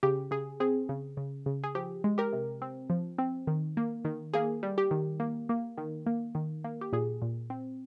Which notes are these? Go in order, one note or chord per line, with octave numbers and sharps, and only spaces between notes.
C#3 G4
C#3 G#4
C4 G#4
C#3
C#3
C#3
G#4
F3 G4
G#3
G4 A#4
C3
C4
F3
C4
D#3
A#3
D#3
A#3 G#4
G3
G4
D#3
A#3
A#3
D#3
A#3
D#3
A#3
G4
A#2 G#4
A#2
C4